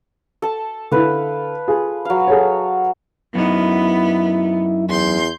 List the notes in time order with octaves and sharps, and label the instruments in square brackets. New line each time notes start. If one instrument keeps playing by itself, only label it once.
[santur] A4 A5
[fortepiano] D3 E4 [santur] B4 F5
[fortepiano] F4 G#4
[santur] F#3 F5
[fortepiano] G#4 A4 C#5
[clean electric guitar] F#2 D#4 [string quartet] B3 [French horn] E4
[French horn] E2 [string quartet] C6 G6